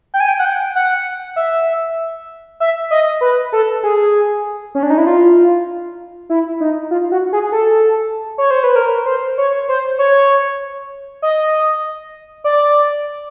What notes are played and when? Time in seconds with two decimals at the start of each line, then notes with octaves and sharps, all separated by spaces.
0.14 G5
0.20 G#5
0.28 G5
0.39 F#5
0.45 G5
0.75 F#5
1.36 E5
2.60 E5
2.91 D#5
3.21 B4
3.52 A4
3.83 G#4
4.75 C#4
4.83 D4
4.90 D#4
4.98 E4
5.07 F4
6.30 E4
6.61 D#4
6.91 F4
7.12 F#4
7.32 G#4
7.52 A4
8.38 C#5
8.51 C5
8.64 B4
8.76 A#4
9.06 C5
9.38 C#5
9.68 C5
9.99 C#5
11.22 D#5
12.44 D5